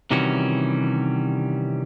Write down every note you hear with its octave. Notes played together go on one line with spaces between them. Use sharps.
C3 D#3 E3 G3 C#4 F#4